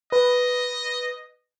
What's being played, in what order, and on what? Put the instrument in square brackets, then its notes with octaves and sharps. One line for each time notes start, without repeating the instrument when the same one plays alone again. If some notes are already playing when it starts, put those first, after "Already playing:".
[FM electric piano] B4 [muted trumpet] D#5